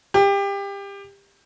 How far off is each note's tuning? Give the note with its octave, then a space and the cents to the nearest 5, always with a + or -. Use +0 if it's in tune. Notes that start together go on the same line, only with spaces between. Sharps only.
G4 +25